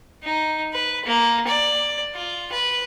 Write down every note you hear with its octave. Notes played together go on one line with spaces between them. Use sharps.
D#4
B4
A#3
D5
F4
B4